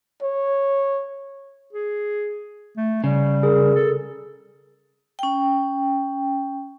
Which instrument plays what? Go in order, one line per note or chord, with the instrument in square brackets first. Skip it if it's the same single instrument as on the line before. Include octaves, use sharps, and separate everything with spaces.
[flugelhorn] C#5
[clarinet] G#4
A3
[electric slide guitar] C#3 [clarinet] G3
[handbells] G#4 A#4
[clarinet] A4
[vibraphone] C#4 G5